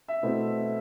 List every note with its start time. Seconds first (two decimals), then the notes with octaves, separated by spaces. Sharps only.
0.08 E5
0.23 B2 A3 C4 E4